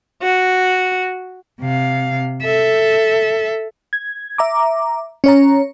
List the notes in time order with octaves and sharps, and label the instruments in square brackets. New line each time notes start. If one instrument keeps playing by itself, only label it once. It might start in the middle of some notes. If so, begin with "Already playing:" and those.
[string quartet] F#4
[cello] C3 F5
A4 E5
[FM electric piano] G#6
E5 A#5 D6
C#4 C#5 A#5